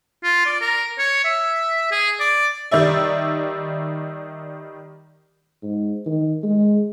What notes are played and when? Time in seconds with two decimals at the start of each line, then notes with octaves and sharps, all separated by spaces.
0.23 F4
0.46 D5
0.61 A#4
0.99 C#5
1.24 E5
1.92 G#4
2.20 D5
2.71 D#3 G3 D5 E5
5.63 G#2
6.06 D#3
6.43 G#3